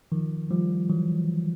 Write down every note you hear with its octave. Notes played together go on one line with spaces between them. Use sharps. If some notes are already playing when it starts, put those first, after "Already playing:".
D#3 F3
F3 G3
E3 F#3